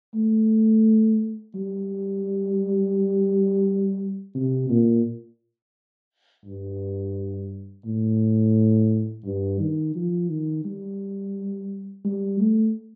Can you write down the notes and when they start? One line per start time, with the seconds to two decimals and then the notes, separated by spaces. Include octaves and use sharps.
0.14 A3
1.55 G3
4.35 C3
4.70 A#2
6.45 G2
7.85 A2
9.24 G2
9.60 D#3
9.95 F3
10.30 D#3
10.65 G3
12.05 G3
12.40 A3